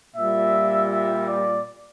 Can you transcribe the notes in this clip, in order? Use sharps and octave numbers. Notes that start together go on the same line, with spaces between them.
A#2 G3 E5
E5
D5